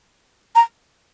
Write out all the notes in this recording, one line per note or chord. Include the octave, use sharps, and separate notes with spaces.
A#5